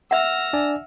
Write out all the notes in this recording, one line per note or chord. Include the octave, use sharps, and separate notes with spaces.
E5 F#5 E6 F6 A#6
D4 D5 G#5